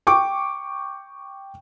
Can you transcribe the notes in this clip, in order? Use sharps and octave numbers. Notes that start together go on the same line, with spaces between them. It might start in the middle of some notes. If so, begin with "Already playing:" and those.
G5 C#6 D6